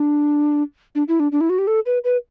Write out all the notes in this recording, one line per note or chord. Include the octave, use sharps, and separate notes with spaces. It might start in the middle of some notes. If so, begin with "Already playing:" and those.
Already playing: D4
D4
E4
D4
D4
E4
F#4
G4
A4
B4
B4